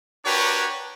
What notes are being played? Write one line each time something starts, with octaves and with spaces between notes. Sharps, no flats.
D4 F#4 G4 A#4 B4 C#5